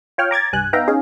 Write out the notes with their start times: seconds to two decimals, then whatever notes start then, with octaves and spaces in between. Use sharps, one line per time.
0.18 F4 C#5 G5 F6
0.31 A#5 D6 G#6 A6
0.53 C2 G2 G#5 F#6
0.73 B3 D#4 E5 F5 G5 A#5
0.88 C#4 D#4 G#4 F5